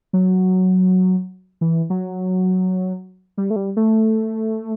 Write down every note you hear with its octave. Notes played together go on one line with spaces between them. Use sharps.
F#3
E3
F#3
G3
A3
G3
A3